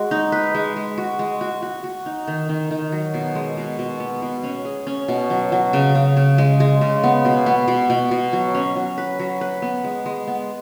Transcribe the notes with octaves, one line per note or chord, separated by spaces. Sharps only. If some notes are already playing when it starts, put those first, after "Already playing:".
Already playing: G#3 F#4
D#4
B4
G#3
G#3
F#4
G#3
F#4
F#4
F#4
D#4
D#3
D#3
D#3
F#3
B2
G#3
B2
B2
B3
B2
C#4
G#4
C#4
B2
F#3
F#3
C#3
C#3
C#3
G#3
G#3
C#3
B3
B2
B3
B2
B2
B2
F#3
C#4
F#3
B4
F#3
B4
B3
G#3
G#3
B3